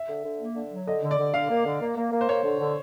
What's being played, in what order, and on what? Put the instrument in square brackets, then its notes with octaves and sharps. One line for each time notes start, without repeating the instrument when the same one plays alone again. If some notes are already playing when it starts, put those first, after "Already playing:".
Already playing: [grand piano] E5
[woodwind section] D3
D3
A#3
D3
F#3
[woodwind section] D3 [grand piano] D#5
[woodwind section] D3
[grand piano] D5
[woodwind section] D3
[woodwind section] D3 [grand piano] F5
[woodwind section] A#3
D3
A#3
A#3
A#3
[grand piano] C5
[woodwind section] A#3 [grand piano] C#5
[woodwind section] D3
D3